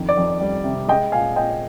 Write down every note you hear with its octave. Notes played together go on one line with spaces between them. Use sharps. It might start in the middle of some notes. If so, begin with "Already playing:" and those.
Already playing: F2 D#3 D4
D5
F2
G3
C3
G#3 D#5 G5
A#2 F5 G#5
A#2 D#5 G5